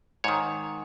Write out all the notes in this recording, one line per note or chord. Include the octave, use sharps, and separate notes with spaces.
G#2 D#3 C#5